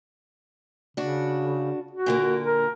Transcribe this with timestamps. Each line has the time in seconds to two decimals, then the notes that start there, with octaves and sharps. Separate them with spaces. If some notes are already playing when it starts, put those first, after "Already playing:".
0.97 C#3 D4 F#4
1.91 F#4
2.06 A#2 D3 A#3
2.45 A#4